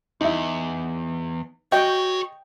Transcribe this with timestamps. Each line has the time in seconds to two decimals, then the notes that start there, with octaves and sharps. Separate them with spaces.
0.21 E2 D#4 E4
1.72 F#4 G#4 C#5 D#5 G5